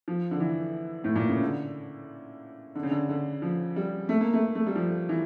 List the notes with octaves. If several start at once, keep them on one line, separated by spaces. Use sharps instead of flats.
F3
D3
E3
A2
A#2
C#3
D3
D3
C#3
D3
D3
F3
G3
A3
A#3
A3
A3
G3
F3
E3